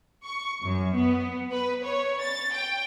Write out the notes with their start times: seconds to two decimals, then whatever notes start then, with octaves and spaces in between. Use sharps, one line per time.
0.24 C#6
0.62 F#2
0.96 B3
1.51 B4
1.85 C#5
2.21 A6
2.53 G5